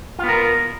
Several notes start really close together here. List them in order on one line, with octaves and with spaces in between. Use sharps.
F4 B3 A#4